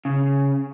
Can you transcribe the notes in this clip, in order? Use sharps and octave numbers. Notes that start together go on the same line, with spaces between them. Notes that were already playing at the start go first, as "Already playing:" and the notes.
C#3